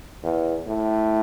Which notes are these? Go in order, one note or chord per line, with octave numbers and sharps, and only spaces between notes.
E2
A2